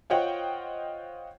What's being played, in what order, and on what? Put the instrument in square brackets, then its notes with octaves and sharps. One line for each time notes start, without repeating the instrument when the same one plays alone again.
[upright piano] F4 C5 C#5 D#5 F#5 G5